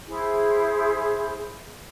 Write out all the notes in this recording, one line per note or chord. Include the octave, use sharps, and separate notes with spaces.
E4 G#4 C5